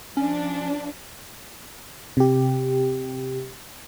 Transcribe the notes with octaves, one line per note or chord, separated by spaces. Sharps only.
F3 C#4 D4
C3 G4